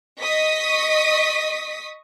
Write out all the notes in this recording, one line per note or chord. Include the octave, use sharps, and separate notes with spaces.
D#5 C#6 D#6 B6